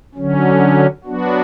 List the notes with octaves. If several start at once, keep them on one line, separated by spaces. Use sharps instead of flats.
D3 F#3 C#4
F#3 B3 D4 F#4